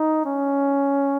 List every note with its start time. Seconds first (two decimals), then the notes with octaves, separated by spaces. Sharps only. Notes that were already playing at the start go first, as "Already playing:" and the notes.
Already playing: D#4
0.26 C#4